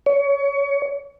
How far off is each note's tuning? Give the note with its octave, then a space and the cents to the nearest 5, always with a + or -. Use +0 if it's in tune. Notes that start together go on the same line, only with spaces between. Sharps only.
C#5 +25